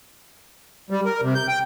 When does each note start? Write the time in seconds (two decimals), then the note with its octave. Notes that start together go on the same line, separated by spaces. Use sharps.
0.90 G3
1.05 A#4
1.22 C3
1.35 G6
1.48 G5